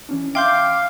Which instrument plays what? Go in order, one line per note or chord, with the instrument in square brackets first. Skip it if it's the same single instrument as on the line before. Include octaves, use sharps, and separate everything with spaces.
[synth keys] E3 C#4 D4
[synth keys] E5 [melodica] F5 [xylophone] G5 C6 G6 [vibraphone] D6